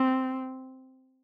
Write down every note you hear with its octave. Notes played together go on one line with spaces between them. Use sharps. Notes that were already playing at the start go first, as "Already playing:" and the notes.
Already playing: C4